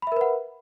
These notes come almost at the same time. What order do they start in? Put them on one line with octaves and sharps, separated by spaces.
B5 E5 A#4 B4 F#5